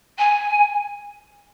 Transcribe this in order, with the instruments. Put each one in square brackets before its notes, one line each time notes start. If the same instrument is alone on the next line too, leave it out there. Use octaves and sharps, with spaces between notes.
[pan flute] G#5